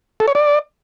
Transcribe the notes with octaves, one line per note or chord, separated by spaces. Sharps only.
A4
C#5
D5